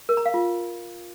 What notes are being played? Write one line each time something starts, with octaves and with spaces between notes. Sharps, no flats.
A#4
A#5
F5
F4